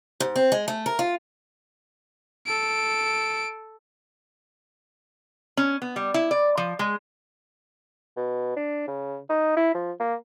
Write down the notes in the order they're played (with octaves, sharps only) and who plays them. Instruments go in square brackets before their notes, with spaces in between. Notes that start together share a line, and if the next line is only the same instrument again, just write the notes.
[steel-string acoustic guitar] G#2
C4
G#3
A3
A#4
F4
[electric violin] A4 D7
[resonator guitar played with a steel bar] C#4
B3
G3
E4
D5
F3
G#3
[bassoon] B2
D4
C#3
D#4
E4
F3
A#3